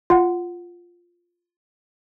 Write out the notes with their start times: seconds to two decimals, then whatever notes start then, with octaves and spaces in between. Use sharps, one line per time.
0.10 F4 F#5